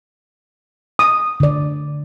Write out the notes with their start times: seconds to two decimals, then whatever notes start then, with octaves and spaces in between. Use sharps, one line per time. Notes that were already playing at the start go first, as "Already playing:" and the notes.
0.99 D#6
1.40 D3 D5